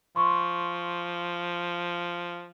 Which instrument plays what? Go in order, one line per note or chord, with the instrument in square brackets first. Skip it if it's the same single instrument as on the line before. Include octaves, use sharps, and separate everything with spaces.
[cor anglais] F3 [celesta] C6 C#6